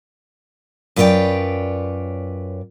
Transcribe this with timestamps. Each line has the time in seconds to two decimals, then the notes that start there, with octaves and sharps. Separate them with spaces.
0.96 F#2 F4 B4 C#5 D5 G5